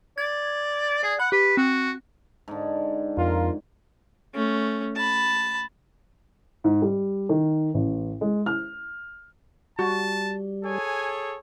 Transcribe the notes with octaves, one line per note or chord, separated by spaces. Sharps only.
D5 G#6
G#4 D5
F#5 B5
G4 B4
C4 F#4
G#2 D3
F2 F4 A#4
A3 C#4
A5 B5
G#2
G3
D#3
A1
G#3
F6
G3 F#4 A5
G#4 A4 C#5 G#5